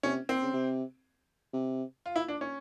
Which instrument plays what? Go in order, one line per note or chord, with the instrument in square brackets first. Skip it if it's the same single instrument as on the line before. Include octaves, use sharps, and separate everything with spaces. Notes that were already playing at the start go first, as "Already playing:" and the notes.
[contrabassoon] C3 [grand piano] C#4
[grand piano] C4
[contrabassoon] C#3
C3
C3
[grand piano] F4
E4
D4
C#4